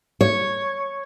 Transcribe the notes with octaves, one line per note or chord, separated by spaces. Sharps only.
C#5